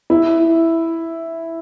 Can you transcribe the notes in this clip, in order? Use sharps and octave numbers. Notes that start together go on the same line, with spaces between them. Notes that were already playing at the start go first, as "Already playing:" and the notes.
E4